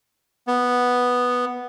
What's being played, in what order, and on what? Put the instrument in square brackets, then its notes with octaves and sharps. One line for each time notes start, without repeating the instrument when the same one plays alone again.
[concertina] B3